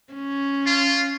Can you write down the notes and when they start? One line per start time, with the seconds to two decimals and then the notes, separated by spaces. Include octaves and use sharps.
0.13 C#4
0.66 F4